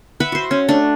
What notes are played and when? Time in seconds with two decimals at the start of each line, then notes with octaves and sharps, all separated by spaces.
0.20 B4 E5 F#5 B5
0.32 F#4 C5
0.51 C#4
0.68 A3 D4